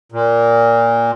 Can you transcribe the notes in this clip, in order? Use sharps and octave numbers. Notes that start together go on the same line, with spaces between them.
A#2